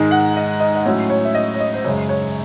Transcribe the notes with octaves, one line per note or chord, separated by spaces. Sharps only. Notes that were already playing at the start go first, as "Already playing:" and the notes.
Already playing: G#2 D#3 G#3
F#5
D#5
D#5
D#5
A2 F#3 C#4 C#5
C#5
E5
D#5
C#5
D#5
C5
F#2 C#3 G#3 C#5
C#5